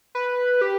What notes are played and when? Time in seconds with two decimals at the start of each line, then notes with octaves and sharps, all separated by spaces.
0.15 B4
0.61 G4